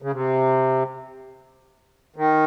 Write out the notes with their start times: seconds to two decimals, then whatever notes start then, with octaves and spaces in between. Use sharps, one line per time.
0.02 C#3
0.12 C3
2.16 D#3